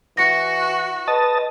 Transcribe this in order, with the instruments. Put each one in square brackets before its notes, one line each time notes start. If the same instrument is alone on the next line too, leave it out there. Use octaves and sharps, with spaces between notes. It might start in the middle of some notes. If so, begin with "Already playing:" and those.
[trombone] E3 [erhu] F#4 [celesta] A#6 C#7
[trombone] B4 [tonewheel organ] D#5 A5